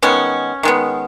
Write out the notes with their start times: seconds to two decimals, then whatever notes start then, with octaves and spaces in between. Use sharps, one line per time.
0.02 D#3 G#3 B3 C#4
0.63 D#3 G#3 B3